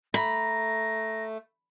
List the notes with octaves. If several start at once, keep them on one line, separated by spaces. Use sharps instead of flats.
A3 A#5 B5 A#6